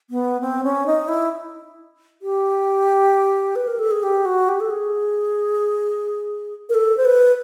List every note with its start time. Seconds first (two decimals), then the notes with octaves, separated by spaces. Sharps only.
0.10 B3
0.41 C4
0.63 C#4
0.86 D#4
1.08 E4
2.22 G4
3.56 B4
3.67 A#4
3.79 A4
3.91 G#4
4.03 G4
4.25 F#4
4.49 G4
4.60 A4
4.70 G#4
6.69 A#4
6.74 A4
6.97 C5
7.05 B4